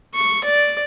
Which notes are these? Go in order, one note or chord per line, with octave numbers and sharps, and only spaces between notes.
C#6
D5